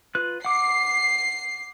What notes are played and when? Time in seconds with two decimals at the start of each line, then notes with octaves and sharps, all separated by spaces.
0.15 F4 B4 F#6
0.45 F#5 D6 C7